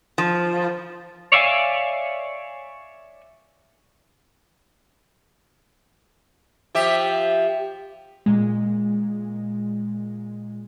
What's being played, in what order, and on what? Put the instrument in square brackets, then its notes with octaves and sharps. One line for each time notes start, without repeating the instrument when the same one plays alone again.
[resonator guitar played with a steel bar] F3
[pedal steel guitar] C#5 D5 E5 F5 G#5
[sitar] F3 G4 E5
[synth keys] A#2 G#3